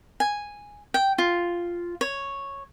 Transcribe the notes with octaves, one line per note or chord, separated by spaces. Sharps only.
G#5
G5
F4
C#5